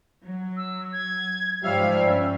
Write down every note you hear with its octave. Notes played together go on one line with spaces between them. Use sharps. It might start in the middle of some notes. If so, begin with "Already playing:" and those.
F#3
E6
G#6
G#2 F3 G3 C#5 E5 F5
G2 C#4